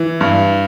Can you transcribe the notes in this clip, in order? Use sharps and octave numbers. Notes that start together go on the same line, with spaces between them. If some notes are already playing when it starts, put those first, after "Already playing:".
Already playing: E3
G2